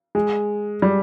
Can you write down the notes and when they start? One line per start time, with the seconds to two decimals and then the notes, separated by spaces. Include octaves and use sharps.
0.15 G#3
0.82 G3